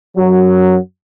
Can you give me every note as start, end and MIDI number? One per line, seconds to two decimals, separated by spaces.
0.17 0.76 42
0.17 0.76 54